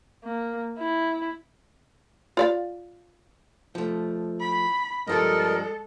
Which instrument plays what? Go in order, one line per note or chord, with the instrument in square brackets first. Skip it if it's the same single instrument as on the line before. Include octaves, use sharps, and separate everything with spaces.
[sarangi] A#3
E4
[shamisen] F4 D5 F5
[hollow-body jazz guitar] F3 A3
[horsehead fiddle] B5
[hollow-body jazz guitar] G2 F3 G3 [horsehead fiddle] G#3 A4 [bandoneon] A#4 D#5